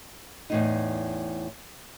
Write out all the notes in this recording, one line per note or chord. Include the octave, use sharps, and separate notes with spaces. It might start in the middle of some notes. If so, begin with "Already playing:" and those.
E2 A2 D#4